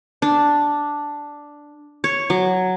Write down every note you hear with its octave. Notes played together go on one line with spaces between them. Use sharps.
D4
C#5
F#3